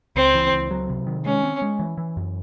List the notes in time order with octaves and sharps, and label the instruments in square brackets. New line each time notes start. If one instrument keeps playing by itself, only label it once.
[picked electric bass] C#2 [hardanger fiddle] C4
[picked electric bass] E3
C#2
F#3
C3
D#3
[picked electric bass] G#3 [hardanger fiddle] C#4
[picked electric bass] C4
G#3
E3
E3
F#2